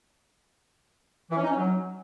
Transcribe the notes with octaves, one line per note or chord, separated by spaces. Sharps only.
E3
C#4
D#4
C#4
F#3